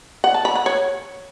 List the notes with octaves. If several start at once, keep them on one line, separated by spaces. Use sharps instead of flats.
F#5
A5
B5
F#5
C#5